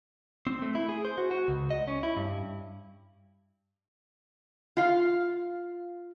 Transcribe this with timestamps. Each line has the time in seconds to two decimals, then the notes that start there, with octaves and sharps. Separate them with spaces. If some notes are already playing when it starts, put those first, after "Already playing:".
0.47 C4
0.62 A3
0.75 E4
0.89 G#4
1.05 C5
1.18 F#4
1.31 F#4
1.48 C#2
1.71 D#5
1.88 C#4
2.03 E4
2.17 G2
4.77 F4 F5